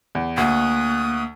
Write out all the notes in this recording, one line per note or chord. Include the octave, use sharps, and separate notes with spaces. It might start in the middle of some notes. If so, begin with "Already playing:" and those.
E2
D2 A#3 C#6 D#6 F#6